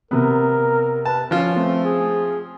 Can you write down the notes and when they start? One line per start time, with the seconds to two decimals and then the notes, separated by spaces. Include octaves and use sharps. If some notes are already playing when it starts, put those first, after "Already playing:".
0.11 C3 B3 A#4
1.05 B4 A5
1.31 F3 C#4 F4
1.56 A3 C4
1.84 G#4